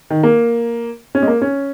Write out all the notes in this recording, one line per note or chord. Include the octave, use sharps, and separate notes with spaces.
D#3
A#3
C#4
G#3
A#3
C#4